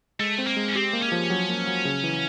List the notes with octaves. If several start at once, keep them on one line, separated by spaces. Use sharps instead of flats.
G#3 A3
C4
A#3
G#3
C#4
C4 G4
A#3
C#4
F3
F#3
A#3
F#3
C#3
E3